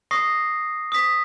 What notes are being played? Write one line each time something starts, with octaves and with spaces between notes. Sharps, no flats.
C#6 D#6 A#6 C7
D#6 B6